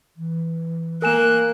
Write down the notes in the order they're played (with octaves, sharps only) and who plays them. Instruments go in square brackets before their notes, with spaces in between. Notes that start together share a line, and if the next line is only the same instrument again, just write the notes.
[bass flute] E3
[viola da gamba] A#3 [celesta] A#4 G#5 E7 [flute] F#6